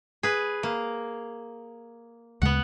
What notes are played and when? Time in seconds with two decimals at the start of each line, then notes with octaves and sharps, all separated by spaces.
0.23 G#4 B4
0.63 A#3
2.42 D2 C#3 G#3 B3 F#5